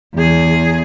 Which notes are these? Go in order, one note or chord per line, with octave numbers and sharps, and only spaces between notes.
E2 G#4